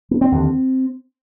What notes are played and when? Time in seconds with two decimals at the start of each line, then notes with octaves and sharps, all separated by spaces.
0.11 B3
0.21 C4
0.32 D#2 D3